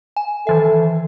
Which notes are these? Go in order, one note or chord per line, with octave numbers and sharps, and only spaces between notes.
G#5
D#3 E3 A4 E5